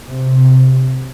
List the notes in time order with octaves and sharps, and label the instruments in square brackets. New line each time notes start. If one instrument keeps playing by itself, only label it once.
[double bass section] C3